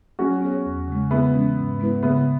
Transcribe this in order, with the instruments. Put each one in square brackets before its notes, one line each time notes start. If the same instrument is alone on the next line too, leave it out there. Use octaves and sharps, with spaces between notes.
[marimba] F#3 [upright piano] C#4 F#4
[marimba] B3 G#4 C#5
E2
C#3 G#3
[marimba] C#3 [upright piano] B3 E4
[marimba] E3 G#3 C#4
G#2
G#3 B3 E4 B4
[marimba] C#3 [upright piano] B3 E4